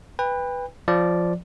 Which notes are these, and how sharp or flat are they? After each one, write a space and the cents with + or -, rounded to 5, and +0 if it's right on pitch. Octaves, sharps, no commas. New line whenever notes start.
B4 +0 G5 +35
F3 +0 D5 +0